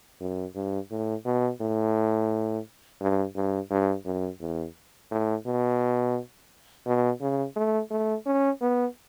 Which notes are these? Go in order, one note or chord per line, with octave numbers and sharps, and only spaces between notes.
F#2
G2
A2
B2
A2
G2
G2
G2
F#2
E2
A2
B2
B2
C#3
A3
A3
C#4
B3